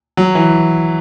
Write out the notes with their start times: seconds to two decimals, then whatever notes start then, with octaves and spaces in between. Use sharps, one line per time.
0.17 F#3
0.35 E3